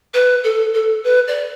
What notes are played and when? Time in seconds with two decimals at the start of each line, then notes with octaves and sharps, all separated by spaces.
0.14 B4
0.44 A4
0.74 A4
1.04 B4
1.27 D5